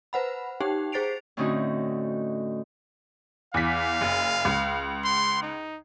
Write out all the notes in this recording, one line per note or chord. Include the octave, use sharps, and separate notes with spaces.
B4 C5 F#5 B5
D#4 G4 G5
G#4 C5 A6 C7 D7 F7
A2 D3 C4 C#4 D#4 F#4
E2 F5 B6
F#1
C#2
C6
D#4